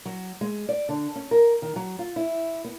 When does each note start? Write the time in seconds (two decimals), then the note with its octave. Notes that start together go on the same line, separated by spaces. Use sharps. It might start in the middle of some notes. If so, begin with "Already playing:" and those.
0.05 F#3
0.41 G#3
0.69 D5
0.89 D3
1.16 C#4
1.31 A#4
1.62 D#3
1.76 F#3
1.99 F4
2.16 E4
2.64 B3